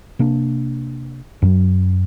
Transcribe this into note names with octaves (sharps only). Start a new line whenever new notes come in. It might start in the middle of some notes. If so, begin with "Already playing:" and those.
C3 A#3 D4
F#2 F#3